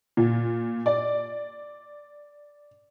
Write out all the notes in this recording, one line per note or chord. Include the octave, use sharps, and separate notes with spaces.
A#2
D5